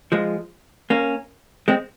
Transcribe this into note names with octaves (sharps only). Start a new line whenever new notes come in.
F3 G#3
A#3 C#4
G#3 C4